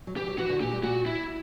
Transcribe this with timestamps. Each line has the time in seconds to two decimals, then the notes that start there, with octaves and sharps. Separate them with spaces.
0.07 F#3
0.17 E3 G4
0.28 F#3
0.38 E3 F#4
0.49 D3
0.61 A#2 G4
0.72 G2
0.83 A#2 F#4
1.06 E4